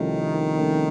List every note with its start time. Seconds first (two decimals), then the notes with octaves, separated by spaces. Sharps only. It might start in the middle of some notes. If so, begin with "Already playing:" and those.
Already playing: C2 C3 D#3 F3 A3 C#4
0.57 C2 C3 F3 A3 C#4